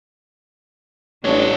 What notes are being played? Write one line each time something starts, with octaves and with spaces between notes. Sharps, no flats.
A1 G3 G#3 C4 D4 C#5